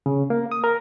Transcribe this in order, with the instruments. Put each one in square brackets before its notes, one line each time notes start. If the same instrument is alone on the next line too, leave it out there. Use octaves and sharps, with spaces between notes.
[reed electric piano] C#3
A#3
D#6
A#4